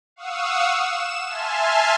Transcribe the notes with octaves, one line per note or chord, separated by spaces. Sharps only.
F5 F#5 C#6 D#6 E6
E7
E5 G#5 A5 C6 F6